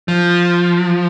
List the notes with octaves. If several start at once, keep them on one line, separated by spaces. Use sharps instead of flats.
F3